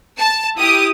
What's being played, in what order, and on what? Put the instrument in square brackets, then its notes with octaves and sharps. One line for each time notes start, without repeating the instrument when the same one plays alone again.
[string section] A5
E4 G4 D#6